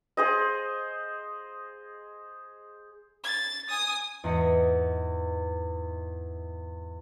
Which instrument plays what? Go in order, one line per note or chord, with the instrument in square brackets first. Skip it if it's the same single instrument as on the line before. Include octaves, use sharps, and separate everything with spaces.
[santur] G#4 C5 D#5
[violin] A6
G#5 D#6
[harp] E2 G#2 D#5 C#7